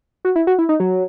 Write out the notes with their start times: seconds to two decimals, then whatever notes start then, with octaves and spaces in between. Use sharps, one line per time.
0.25 F#4
0.36 E4
0.47 F#4
0.59 E4
0.69 D#4
0.80 F#3